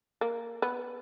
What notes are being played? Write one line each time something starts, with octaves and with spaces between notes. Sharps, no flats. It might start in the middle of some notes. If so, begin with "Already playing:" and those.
A#3
B3